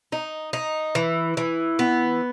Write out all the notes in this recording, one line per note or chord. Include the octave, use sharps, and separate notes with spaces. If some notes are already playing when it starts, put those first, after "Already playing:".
D#4
D#4
E3
E3
B3